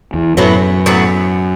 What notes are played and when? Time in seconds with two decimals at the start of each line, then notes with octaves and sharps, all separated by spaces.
0.14 E2
0.37 F#2 A2 F#3 B3
0.86 A2 F#3 B3